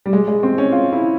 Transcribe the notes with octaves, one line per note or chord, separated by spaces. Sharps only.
G3
G#3
G#3
C4
C#4
F4
E4